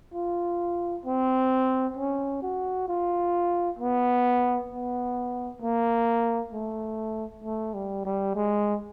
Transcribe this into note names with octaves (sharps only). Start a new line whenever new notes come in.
F4
C4
C#4
F#4
F4
B3
B3
A#3
A3
A3
G3
G3
G#3